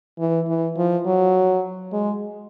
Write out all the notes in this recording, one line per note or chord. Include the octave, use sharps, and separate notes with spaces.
E3
E3
F3
F#3
G#3